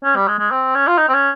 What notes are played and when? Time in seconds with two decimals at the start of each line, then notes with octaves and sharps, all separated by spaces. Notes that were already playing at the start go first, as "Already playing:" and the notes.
0.04 C#4
0.16 G3
0.28 G#3
0.39 G#3
0.51 C4
0.75 C#4
0.87 F4
0.98 D#4
1.08 C4
1.14 C#4